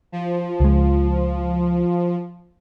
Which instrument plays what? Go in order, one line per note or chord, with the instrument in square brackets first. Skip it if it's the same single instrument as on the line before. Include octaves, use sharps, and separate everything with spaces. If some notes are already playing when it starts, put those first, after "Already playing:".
[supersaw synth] F3
[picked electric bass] C#2 G#3